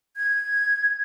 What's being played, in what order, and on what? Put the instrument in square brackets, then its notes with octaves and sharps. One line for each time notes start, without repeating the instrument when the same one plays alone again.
[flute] G#6